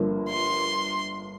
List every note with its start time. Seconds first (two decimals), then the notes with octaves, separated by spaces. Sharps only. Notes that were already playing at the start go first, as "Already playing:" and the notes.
Already playing: G1 G2 D3 F3 A#3
0.29 C6